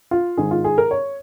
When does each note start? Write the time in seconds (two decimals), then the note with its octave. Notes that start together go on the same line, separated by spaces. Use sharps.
0.11 F4
0.37 G#2 D#3 G#3 G#4
0.51 F4
0.64 G#4
0.78 A#4
0.91 C#5